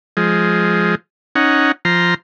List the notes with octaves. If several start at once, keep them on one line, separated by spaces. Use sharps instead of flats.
F3 G#3
C#4 D#4 F#5
F3 A#5 C6